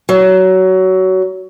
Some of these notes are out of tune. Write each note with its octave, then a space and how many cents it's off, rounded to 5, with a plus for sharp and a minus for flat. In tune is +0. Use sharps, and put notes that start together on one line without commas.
F#3 +20